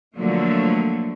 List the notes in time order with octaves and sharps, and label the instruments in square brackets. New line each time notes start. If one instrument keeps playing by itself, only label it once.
[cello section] D3 F3 F#3 A3 A#3